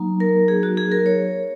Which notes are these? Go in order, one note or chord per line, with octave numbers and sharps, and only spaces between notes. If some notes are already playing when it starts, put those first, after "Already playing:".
Already playing: F#3 A#3 D#4
A#4
G#4
F#4
G#4
A#4
C#5